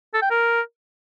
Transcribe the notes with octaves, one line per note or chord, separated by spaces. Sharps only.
A4
G5
A#4